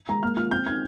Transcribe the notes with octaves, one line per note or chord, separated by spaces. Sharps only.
G#3 A#5
A#3 F6
F4 F6
C4 G6
D#4 G#6